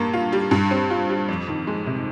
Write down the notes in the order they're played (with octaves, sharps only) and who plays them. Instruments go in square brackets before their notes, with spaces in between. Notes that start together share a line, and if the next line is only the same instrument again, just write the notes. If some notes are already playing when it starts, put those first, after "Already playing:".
Already playing: [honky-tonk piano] G2 A#3
F4
G3
G2
C4
F4
G3
F2
D#3
G#3
C3